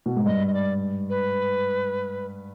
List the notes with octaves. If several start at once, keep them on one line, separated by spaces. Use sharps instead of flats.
B2
G#2
G2 D#5
D#5
D5
B4